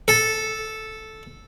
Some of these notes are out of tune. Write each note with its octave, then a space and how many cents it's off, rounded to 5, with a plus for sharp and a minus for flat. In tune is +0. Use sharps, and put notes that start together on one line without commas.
A4 -5